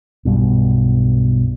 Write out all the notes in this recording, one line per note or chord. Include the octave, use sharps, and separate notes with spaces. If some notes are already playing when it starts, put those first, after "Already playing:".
B1 G2 B2